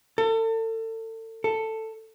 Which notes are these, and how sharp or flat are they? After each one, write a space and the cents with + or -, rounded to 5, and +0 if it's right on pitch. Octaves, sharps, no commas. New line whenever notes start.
A4 +35
A4 +10